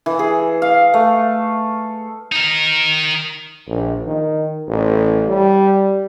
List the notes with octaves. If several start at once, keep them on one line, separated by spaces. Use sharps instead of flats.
E3
G#4
F5
A3
D#4 A#4
A#1
D#3
A1
G3